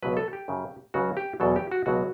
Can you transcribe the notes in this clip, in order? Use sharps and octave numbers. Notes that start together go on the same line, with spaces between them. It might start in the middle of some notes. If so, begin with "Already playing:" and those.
C#2 B2 F#3 B4
A4
G4
F#2 C#3 F#3
C#2 C#3 F#3 F#4
G4
E2 B2 F#3 A4
G4
F#4
C#2 B2 F#3 F#4